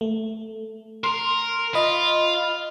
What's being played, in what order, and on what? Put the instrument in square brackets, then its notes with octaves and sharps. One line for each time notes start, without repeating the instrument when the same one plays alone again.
[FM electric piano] A3
[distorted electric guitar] A#4 [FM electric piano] C6
[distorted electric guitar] F4 [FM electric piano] D#5 B5